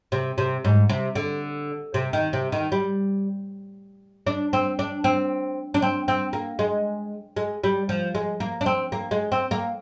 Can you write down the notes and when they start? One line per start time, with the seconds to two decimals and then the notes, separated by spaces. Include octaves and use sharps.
0.12 C3
0.38 C3
0.64 G#2
0.89 C3
1.15 D3
1.94 C3
2.13 D#3
2.33 C3
2.52 D#3
2.72 G3
4.27 D4
4.53 C4
4.79 D4
5.04 C4
5.74 D4
5.82 C4
6.08 C4
6.33 A#3
6.59 G#3
7.37 G#3
7.64 G3
7.89 F3
8.15 G#3
8.40 A#3
8.61 D4
8.66 C4
8.92 A#3
9.11 G#3
9.32 C4
9.51 A#3